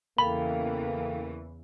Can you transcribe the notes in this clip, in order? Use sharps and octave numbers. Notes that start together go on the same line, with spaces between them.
E2 C#3 E3 A#3 A4 F5 G5 B5